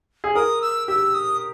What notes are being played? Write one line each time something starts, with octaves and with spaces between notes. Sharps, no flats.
G#4
A#4 D#6
E6
G4 E6
D#6